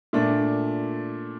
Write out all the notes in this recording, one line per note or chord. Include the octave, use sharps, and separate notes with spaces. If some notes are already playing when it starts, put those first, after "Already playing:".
A#2 A3 D4